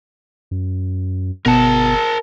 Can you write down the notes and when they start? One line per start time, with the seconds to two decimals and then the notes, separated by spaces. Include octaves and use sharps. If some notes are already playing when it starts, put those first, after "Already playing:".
0.51 F#2
1.46 G1 B2 A#4 A5